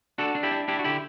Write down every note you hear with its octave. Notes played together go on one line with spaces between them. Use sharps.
D4 F#4 A4
D4
E4 G4
D4
D4 E4 G4
F#4
D3 E4 G4